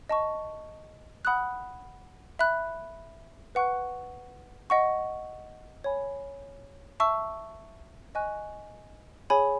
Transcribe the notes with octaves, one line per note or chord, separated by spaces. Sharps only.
D#5 A5 C#6
F#5 B5 D#6 F#6
E5 B5 F#6
B4 F#5 C#6 F#6
D#5 F#5 C#6
C#5 G#5 B5
E5 A5 C#6 E6
D#5 G#5 C#6 F#6
G#4 C#5 G#5 B5